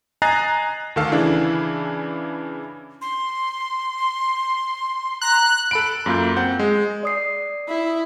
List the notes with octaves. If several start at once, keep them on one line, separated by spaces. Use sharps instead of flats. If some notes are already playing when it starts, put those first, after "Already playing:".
D#5 G#5 A#5 F#6 A6 C7
D2 D#3 A4 F5
C#3 E3 D4 E4
C6
A#5 F#6
A4 B5 D7
F#2 A#3 F4 G6
C4 F#5 G6
G#3
D5 D#6 C7
E4